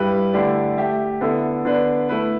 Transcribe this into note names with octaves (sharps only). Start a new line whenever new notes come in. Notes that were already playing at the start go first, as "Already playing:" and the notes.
Already playing: G2 G3 E4 G4 B4
D3 A3 E4 G4 D5
A3 G4 E5
D3 B3 E4 A4 E5
D3 B3 D4 B4 D5
A3 E4 B4